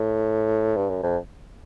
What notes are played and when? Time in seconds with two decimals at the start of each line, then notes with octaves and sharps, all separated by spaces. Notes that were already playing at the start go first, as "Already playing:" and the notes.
Already playing: A2
0.76 G2
0.89 F#2
1.03 F2